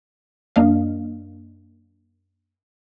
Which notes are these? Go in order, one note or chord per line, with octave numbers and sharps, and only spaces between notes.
F#2 A#3 D4 D#5 F5